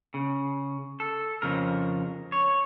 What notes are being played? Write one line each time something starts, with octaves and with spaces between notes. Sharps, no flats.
C#3
A4
F2 C#3 A#4
C#5